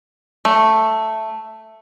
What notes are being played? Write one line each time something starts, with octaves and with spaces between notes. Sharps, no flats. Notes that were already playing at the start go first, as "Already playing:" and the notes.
A3